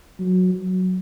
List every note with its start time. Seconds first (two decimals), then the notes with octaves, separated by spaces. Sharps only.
0.19 F#3
0.55 F#3